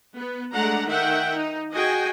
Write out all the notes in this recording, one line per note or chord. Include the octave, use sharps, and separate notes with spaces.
B3
G#3 A3 D4 F#5 A#5
D#3 E5 F#5 G5
D#4
F#4 G#4 D#5 G5 G#5